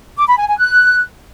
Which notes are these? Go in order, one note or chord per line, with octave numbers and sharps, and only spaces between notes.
D6
B5
G#5
G#5
F#6